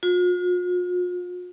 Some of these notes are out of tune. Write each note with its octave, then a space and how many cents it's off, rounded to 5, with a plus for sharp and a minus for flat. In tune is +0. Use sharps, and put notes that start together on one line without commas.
F4 +45